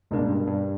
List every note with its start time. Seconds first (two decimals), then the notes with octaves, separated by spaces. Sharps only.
0.11 C#2 G2 B2 A#3 D4
0.30 G2
0.48 G2